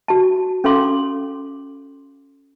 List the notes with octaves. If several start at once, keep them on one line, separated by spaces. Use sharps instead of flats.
F#4 A5
C#4 A4 F5 C6 D6